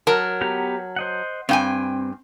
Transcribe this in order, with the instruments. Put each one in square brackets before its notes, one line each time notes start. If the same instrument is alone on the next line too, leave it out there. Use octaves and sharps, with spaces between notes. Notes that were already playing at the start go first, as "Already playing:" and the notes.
[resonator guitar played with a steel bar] F#3 A#4 A5
[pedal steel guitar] B3 G4 A#5
C5 D#5 F#5
[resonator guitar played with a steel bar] G2 G5 G#5 [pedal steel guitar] C4